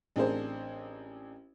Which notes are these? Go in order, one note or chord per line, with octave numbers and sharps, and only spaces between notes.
A1 C4 D4 G#4 A#4 C5